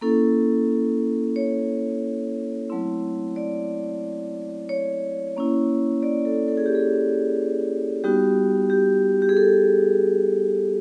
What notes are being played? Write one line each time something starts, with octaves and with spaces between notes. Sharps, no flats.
A#3 C#4 E4 A4
C#5
F#3 A3 C4 E4
D5
C#5
A#3 C#4 E4
D5
A4
A4
G#4
G4
G#4
G3 B3 D#4 F#4 G4
G4
G4
G#4
A4